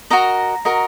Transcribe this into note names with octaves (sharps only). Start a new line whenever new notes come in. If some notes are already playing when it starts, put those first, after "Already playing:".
F#4 A#4 D#5 A#5
F#4 A#4 D#5